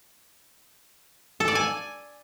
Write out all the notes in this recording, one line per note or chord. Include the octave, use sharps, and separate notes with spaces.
A4
D5
G#5